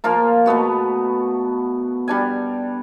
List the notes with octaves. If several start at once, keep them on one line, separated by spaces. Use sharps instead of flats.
F3 A#3 F4 A#4
B2 A3 B3 F#4
G3 D4 G#5